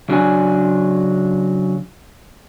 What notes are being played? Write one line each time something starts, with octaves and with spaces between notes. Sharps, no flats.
C#3 F#3 D4 D5 G#5